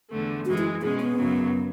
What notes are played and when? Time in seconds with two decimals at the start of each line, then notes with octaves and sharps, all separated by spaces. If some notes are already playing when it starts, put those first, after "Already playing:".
0.09 E2 D3 A3
0.45 F#2 E3 G#3 F#4
0.58 E4
0.81 B2 G#3 C#4 G#4
1.00 B3
1.17 F#2 C#3 F#3